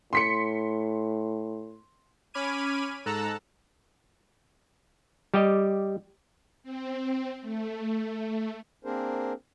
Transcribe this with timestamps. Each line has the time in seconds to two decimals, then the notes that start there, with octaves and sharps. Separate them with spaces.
0.13 A2 C6 B6 C#7
2.34 C#4 B5 D6 F6 G#6 D#7
3.06 G#2 A4 A5 A#5 E6 F#6
5.34 G3 G4 D#5
6.63 C4
7.42 A3
8.85 A#3 C4 D4 G#4 A#4 C5